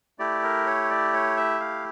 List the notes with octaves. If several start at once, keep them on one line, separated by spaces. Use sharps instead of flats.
A3 E4 G4 D5
A#4
C#5
D5
C#5
E5
F5